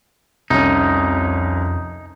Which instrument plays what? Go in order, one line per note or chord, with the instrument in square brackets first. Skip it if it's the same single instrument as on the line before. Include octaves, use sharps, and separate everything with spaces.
[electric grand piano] C2 C#4 [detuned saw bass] F2 [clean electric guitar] D#4